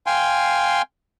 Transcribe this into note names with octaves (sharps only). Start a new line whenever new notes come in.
F5 G5 G#5 C6